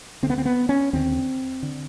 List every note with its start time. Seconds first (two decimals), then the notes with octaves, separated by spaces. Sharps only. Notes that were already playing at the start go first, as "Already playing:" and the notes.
0.23 D3 C4
0.27 D2 B3
0.38 C4
0.45 B3
0.69 C#4
0.93 D#2 D3 C4
1.63 D3